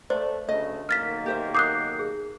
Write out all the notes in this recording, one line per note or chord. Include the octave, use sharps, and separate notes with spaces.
A3 B4 C5 D5
D2 C#3 A3 D#5
B1 D#3 A#3 F6 A6 B6
G4 C5 E5
D6 D#6 F#6 G6 C7
G#4